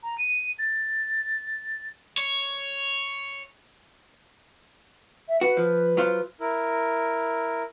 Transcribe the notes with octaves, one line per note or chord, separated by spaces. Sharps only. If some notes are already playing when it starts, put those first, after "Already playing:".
A#5
D#7
A6
C#5
E5
F#4 B4
F3
F#3 F4 C5
E4 A#4